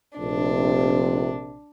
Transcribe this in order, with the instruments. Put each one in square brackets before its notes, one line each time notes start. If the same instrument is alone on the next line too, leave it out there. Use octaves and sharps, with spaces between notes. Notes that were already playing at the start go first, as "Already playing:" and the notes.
[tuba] F1 [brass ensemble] A#1 C3 [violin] D4